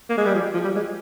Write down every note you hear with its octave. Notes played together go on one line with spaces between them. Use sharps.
A#3
G#3
G3
F3
F3
G3
G#3